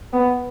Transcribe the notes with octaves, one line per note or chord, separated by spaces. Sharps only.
B3